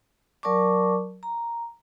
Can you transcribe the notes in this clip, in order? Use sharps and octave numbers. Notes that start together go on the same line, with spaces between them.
F#3 A#4 D5 A5 C#6 D6
A#5